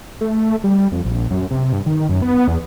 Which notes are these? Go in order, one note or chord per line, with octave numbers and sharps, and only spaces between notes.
A3
A3
G3
F2
A#1
F#2
C3
G2
D#3
F#2
B3
E2